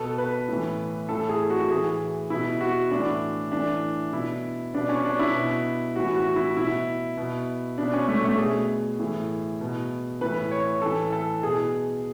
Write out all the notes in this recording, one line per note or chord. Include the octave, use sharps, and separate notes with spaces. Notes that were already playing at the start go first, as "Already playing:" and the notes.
Already playing: B2 A4
B4
A2 E3
A2 E3 A4
G#4
F#4
A2 E3 G#4
B2 E4
F#4
A2 E3 D4
A2 E3 D4
B2 E4
B2 D4
C#4
D4
E4
B2
A2 E3 F#4
F#4
E4
B2 E4
B2
B2 D4
C#4
A3
A3
B2 G#4
A2 E3
B2
A2 E3 B4
C#5
A2 E3 A4
A4
B2 G#4